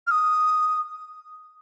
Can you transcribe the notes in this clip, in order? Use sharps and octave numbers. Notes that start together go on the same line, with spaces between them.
F6
D#6